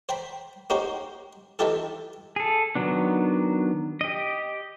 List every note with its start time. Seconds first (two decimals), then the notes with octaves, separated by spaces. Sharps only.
0.09 C5 G5 A#5 B5
0.70 A#3 C#4 D#4 F#4 G4 C5
1.59 E3 A3 D#4 F4 G4 A4
2.36 G#4 A4
2.75 D#3 F#3 B3 D4
4.01 G4 D#5